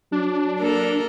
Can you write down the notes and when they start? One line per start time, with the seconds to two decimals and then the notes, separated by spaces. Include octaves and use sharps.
0.12 F#3 D4
0.59 A#3 A4 A#4